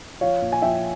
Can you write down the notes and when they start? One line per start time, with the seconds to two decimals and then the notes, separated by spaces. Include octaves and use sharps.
0.21 F3 C#5 F5
0.42 A#2
0.52 G#5
0.62 F3 E5 G5